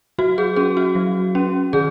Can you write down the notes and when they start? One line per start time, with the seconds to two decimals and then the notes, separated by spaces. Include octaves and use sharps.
0.18 F#3 F#4
0.38 G#4
0.56 C#4 G#4
0.77 F#4
0.95 F#3
1.35 C#4
1.73 D#3 G#4